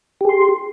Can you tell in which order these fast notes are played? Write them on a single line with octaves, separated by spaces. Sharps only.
G4 G#4 C6